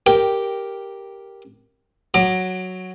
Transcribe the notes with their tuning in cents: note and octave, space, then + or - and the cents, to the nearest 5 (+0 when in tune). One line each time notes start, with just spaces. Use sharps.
G4 +0 A#4 +0 G5 -10
F#3 +0 A#5 +0 D6 +25